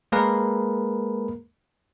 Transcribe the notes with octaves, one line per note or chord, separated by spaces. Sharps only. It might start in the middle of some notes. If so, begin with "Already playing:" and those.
G#3 A#3 G#4 A#4 B4